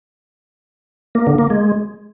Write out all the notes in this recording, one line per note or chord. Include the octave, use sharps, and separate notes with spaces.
A#3
D3
A#3
G#3